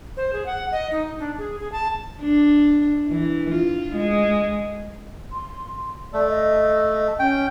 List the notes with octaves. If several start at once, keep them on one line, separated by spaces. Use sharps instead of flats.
C5
G#4
F#5
D#5
D#4
D4
G#4
G#4
A5
D4
E3
F4
G#3
C6
A3 D5
D#5
C#4 G5